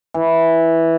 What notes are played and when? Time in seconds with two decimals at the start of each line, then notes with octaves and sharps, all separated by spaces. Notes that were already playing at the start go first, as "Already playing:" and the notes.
0.14 E3